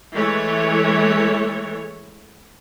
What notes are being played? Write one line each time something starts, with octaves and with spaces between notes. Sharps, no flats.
E3 G#3 A3 C#5